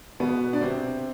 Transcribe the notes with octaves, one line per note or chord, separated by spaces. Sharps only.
B2 B3
D4
C3 C4